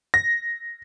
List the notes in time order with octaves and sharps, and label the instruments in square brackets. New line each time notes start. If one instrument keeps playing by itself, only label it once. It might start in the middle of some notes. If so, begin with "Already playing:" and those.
[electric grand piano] A#6